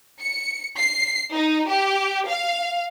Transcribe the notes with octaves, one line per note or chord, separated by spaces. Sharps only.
C#7
C7
D#4
G4
F5